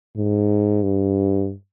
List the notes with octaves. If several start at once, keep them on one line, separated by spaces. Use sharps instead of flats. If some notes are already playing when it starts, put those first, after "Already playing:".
G#2
G2